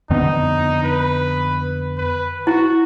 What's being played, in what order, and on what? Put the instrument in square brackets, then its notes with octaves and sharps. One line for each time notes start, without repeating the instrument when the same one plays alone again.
[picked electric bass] F2 D3 B3 [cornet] D#4
[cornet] B4
B4
[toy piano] E4 [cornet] F#4